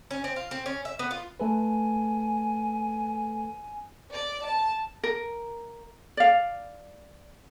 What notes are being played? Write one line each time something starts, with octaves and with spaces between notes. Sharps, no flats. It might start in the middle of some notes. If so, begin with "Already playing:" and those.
C#4
C4
F4
C4
C#4
E5
B3
F4
A3 A4 B4 G#5
D5
A5
A#4
D5 F5